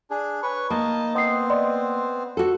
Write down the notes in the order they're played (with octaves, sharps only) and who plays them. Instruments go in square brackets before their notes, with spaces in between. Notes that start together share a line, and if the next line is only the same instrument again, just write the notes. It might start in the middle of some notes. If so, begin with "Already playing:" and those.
[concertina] D4 G#4
B4 C#5 C#6
[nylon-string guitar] A#3 [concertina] D#4 D#5 A5
[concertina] B3 C4 C5 [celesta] D#5 D#6 C7
[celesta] D5 D#5 C6
[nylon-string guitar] F#4 A4